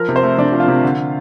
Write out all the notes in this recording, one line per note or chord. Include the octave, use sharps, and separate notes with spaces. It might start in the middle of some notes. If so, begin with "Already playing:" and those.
Already playing: F3 A#4
C3
C5
A3
C3 D4
F3
F4
C3
D3